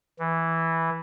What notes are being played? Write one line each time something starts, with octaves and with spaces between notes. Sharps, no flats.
E3